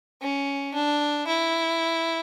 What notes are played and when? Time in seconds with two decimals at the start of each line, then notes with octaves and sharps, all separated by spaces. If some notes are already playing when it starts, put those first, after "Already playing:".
0.22 C#4
0.74 D4
1.27 E4